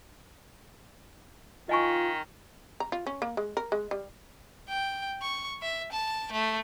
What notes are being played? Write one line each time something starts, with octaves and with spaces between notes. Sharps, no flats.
D#3 F4 D#5 G#5 C#6
A#5
F4
C#4
A#3
G#3
A#4
G#3
G3
G5
C#6
E5
A5
A3